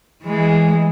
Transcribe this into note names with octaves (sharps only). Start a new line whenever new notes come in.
E3 G#3